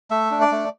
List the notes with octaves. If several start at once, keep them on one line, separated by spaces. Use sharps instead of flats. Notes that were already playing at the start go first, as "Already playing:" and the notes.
A3 E5
D4
D5
A3